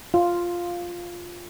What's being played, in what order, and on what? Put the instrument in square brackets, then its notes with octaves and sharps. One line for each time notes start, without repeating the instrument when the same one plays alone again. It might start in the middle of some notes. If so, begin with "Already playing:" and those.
[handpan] F4